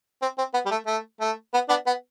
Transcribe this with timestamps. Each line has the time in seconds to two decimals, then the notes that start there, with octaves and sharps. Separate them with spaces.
0.22 C4
0.38 C4
0.54 B3
0.65 G3
0.71 A3
0.87 A3
1.21 A3
1.54 B3
1.69 B3 D4
1.87 B3